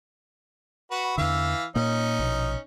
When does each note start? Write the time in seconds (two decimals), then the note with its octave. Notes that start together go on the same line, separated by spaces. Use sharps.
0.91 F#4 B4
1.18 E2 D3 E3 F5 E6
1.76 A#2 A#3 C#4 D#4
2.19 A#1 B2